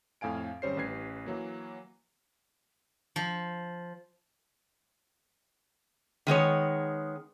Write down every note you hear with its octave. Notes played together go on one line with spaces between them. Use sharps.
F2 A2 F5 G#5 D7
G#1 G3 C#4 C5 C#5 C7
A1 G4 B4 G#6 C7
E3 F#3 A#3
F3
D#3 G#3 B3 C#5